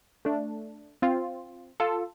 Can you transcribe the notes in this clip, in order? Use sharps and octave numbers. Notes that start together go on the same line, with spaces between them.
A3 D4
C4 F4
F4 A4